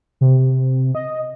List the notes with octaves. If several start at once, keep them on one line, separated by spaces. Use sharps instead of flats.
C3
D#5